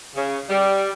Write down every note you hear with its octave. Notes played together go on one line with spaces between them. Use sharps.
C#3
G3